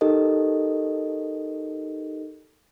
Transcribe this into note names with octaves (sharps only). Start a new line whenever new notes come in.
D#4 G4 A4 A#4 D#5